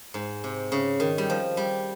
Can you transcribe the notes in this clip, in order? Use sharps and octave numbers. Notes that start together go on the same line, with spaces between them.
G#2
C3
C#3
D#3
G3
F3
G3